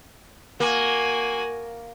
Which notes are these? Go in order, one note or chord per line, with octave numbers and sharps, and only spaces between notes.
A#3 F#4 G#5